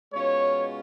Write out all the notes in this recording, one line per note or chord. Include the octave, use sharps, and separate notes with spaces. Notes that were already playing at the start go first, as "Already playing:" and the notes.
B2 G#3 C#4 F4 C#5